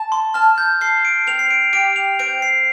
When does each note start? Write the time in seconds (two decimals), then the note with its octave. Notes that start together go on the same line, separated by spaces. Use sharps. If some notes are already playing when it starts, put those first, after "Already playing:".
Already playing: A5
0.12 C6
0.34 A5 F6
0.58 G6
0.81 A4 C7
1.05 D7
1.27 C4 F7
1.39 C7
1.51 D7
1.73 G4 D7
1.96 F7
2.19 C4 D7
2.42 C7